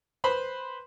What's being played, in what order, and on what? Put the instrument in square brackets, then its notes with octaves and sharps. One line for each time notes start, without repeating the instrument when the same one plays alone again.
[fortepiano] B4 C5 B5 C6